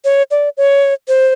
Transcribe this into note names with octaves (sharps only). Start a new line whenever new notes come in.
C#5
D5
C#5
C5